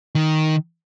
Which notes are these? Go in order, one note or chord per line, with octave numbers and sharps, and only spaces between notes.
D#3